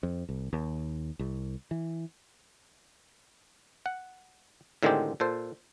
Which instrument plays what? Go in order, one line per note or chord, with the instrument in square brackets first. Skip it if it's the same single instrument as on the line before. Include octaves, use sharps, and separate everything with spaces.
[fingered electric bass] F2
C2
D#2
C2
E3
[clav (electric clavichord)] F#5
A2 D3 D#3 G#3 C4 G4
A#2 A4 C5